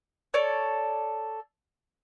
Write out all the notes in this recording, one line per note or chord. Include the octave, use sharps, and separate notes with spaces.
A4 C#5 D5